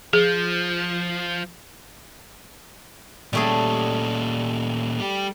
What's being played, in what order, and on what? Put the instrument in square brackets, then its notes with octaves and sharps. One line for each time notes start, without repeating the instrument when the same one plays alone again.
[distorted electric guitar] F3 [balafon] G#4
[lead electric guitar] A#2 C#4 [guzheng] G3 A3 G#4
[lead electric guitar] G3 G4